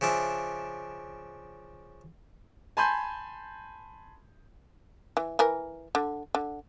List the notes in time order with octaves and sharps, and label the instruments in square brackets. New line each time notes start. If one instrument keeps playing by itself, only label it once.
[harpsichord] C#3 F3 D4 E5
[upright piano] G#5 A5 B5 C6 G6 D#7
[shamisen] E3
E3 A#4
D3
D3